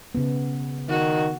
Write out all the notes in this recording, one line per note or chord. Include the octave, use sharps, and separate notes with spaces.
C#3 B3
D#3 F#4